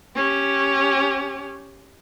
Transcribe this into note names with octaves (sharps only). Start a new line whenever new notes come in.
C#4 G4